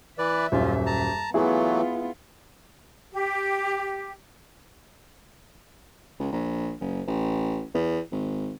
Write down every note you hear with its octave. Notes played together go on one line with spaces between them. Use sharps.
E3 B4 D5 E5
D#1 F#2 F4
A5 A#5
E3 F#3 A3 B3 E4 F4 G#4
G4
C#2
A#1
F#1
A1
E2
G#1